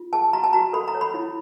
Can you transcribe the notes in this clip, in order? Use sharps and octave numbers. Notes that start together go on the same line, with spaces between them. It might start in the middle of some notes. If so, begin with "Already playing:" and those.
Already playing: F4
G#4 A5
F#4 A#5
A5
F#4 A#5
A4 B5
A#5
C#5
B5
E4